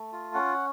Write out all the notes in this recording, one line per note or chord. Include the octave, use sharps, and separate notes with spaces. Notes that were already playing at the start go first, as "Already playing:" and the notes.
Already playing: A3
F4
C#4 F#5